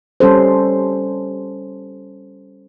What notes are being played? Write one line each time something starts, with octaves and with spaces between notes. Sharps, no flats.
G3 C#4 A4 C5